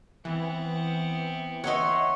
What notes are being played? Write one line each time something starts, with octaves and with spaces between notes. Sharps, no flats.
E3 B3 C4
C#5 D#5 E5 F#5 C6